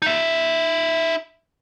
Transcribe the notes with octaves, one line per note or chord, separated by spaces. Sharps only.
D#4 E5